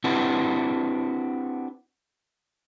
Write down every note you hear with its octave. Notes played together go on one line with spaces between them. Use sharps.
C4 D4 E4 F#4 G4 B4